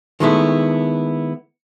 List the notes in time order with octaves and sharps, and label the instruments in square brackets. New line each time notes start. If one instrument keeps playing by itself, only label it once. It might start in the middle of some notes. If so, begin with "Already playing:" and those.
[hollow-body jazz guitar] D#3 G#3 A3 B3 E4